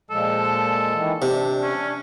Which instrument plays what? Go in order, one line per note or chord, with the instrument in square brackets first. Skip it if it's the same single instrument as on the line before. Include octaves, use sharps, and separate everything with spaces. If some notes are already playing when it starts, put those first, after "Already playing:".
[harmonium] A#2 F3 G#3 [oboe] A4
[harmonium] D#3 E3 G#3
[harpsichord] C3 [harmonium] D4
[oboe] C#4